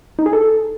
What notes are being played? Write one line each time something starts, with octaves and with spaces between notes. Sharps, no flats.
D#4
G#4
A4